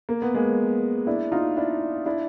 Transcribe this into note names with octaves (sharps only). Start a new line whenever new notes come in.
A#3
B3
G#3 A#3
D4 E4
D#4 F4
D4 E4
D4 E4